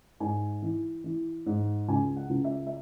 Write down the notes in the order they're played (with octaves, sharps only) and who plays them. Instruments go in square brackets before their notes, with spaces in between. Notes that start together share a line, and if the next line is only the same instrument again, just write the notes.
[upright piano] G#2 G#5
E3
E3
G#2
C#2 G#5
F#5
C#2
E5
E5